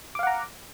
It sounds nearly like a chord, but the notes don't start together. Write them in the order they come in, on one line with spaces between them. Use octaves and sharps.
D6 F5 F#5 A#5